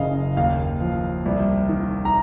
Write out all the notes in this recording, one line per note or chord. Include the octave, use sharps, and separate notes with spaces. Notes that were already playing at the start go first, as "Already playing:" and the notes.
Already playing: F#1 C#3 D#5 F5
D#2 F5
F3
C2
D#3
A#5